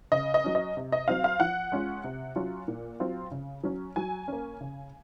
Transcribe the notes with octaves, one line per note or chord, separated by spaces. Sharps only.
C#3 D#5
D#5
F#3 C#4
D#5
C3
D#5
F#3 C4 F5
F5
F3 F#5
G#3 C#4 F4
C3
F#3 C#4 F4
A#2
F#3 C4 F4
C#3
F#3 C#4
F#3 G#5
A#3 C#4
C#3